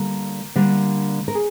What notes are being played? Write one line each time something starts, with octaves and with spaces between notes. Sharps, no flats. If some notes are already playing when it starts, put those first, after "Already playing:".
Already playing: D3 G3 A#3 A#4
D3 G3 A#3
A#4
G#4